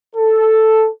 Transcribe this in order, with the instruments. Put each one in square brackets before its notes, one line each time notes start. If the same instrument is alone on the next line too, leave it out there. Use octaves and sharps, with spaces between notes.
[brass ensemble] A4